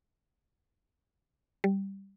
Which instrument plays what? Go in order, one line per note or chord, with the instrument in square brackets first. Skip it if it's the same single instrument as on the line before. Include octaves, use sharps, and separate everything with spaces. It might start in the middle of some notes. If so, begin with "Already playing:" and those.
[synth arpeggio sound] G3